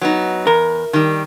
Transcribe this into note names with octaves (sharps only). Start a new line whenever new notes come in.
F#3 B3 D#4
E2 A#4
D#3 G3